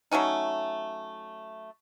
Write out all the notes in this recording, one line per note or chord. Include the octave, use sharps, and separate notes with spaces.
F#3 A3 C#4 D#4